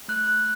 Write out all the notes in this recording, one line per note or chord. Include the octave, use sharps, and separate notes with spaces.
A3 F#6